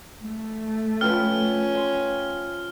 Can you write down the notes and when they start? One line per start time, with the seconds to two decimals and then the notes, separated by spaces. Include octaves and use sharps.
0.23 A3
1.01 F3 C#4 B4 G5 F6
1.75 C6